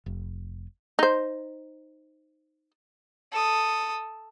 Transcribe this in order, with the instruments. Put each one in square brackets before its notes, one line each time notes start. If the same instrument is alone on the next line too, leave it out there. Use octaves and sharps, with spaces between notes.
[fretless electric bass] F1
[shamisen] D#4 C5
[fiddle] A4 D#6